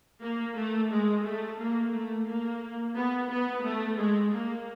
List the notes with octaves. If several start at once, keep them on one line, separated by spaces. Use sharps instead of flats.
A#3
A3
G#3
A3
A#3
A3
A#3
B3
B3
A3
G#3
A#3